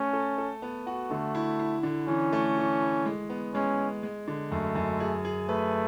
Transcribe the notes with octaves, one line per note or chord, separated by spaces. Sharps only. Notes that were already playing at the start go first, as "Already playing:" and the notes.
Already playing: A3 C#4
A4
A4
B3
F#4
D3 A3
E4
E4
D3
E3 C#4
A3
E3
E4
G#3
B3
G#3 C#4
G#3
G#3
D3
F#2 A3
F#2
G#4
G#4
A3 B4